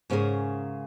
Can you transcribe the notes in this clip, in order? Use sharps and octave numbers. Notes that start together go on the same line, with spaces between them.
G#2 C#3 C#4 F#4 G#4 A#4